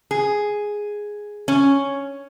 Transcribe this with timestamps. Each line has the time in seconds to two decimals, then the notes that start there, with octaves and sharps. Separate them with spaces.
0.11 G#4
1.48 C#4